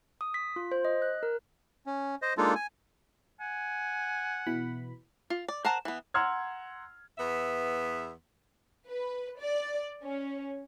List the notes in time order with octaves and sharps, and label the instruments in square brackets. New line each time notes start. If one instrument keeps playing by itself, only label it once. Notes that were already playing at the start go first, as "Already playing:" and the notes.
[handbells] D#6
B6
F4
C5
D#5
F#6
A#4
[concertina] C#4
C5 D#5
G#3 A#3 D4 D#4 F4 A4
G#5
[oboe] F#5 [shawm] G#5
[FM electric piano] B2 E3 B5
[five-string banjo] F4
D5
A#4 C5 F#5 A5 A#5
E3 B3
[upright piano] F#5 A#5 C6 E6 F6 G#6
[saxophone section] E2 B3 E5
[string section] B4
D5
C#4